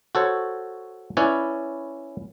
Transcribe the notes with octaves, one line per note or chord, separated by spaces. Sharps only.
F#4 A4 C5 C#5
C#4 E4 B4 C#5 D5